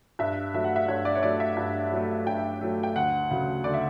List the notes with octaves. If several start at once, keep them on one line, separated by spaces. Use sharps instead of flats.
G2 E5
F#3 A3 E5
F#5
E5
G2 C#5
D5
C#5
F#3 A3 D5
E5
G2
F#3 A3
G2 G5
F#3 A3
G5
D2 F#5
C#3 F#3 A3
D2 D5
E5